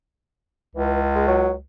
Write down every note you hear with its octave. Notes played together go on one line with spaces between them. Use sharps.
C#2 E3
G#3
F#3